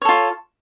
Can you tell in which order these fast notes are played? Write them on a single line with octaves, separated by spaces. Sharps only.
C#5 A4 F4